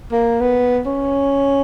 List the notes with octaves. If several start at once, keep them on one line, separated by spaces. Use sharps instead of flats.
A#3
B3
C#4